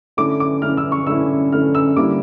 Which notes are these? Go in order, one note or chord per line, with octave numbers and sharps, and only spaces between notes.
D3 A3 C#4 E4 D6
D6
D3 A3 C#4 E4 F6
E6
C#6
D3 A3 C#4 E4 E6
D3 A3 C#4 E4 F6
E6
D3 G3 A#3 E4 D6